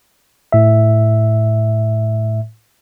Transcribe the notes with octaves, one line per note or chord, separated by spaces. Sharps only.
A2 E5